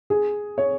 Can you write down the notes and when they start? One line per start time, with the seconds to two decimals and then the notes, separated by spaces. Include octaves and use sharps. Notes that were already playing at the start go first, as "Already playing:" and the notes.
0.10 G#4
0.58 C#5